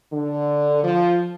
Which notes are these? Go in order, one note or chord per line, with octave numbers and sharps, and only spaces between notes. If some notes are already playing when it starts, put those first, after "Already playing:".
D3
F3